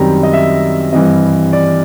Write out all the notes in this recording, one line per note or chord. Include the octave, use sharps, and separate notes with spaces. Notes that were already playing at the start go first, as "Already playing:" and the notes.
Already playing: F#2 D#3 G3 C4 A#5
D#5
E5
G2 E3 G3 C4 D#5
D5